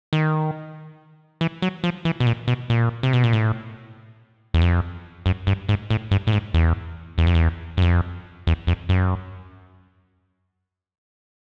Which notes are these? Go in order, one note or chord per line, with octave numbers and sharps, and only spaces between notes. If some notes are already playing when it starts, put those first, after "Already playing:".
D#3
E3
F#3
F3
E3
B2
A#2
B2
A#2
C3
B2
A#2
A2
E2
F2
F#2
G2
G#2
A2
G2
A2
G#2
E2
E2
F2
E2
F#2
F2
E2
F2
F#2